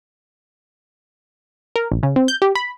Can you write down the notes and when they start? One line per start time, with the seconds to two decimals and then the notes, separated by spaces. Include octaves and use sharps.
1.76 A#4
1.92 A#1
2.03 C#3
2.16 C4
2.28 G6
2.42 G4
2.55 B5